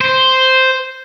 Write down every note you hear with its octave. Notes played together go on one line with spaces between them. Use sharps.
C5